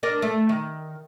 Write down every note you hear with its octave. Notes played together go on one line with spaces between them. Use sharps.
D4 A#4 D#5
A3
D#3